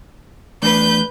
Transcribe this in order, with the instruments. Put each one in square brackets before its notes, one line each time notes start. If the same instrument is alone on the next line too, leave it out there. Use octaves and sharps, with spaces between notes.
[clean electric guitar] E2 A3 D4 [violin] B4 G6